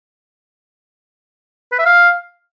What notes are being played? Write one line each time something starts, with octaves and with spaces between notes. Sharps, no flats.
B4
E5
F5